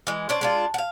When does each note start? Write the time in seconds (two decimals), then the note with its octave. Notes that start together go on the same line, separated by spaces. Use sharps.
0.07 E3 G#3
0.29 C#4 D4 C5 D5
0.41 G#3 D4 F4
0.74 F5 F#5